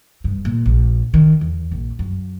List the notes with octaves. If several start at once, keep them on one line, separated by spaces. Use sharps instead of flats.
G2
A#2
A#1
D#3
E2
A#1
F#2